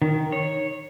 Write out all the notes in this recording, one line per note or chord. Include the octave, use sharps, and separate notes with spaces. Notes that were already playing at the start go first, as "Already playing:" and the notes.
D#3
C#5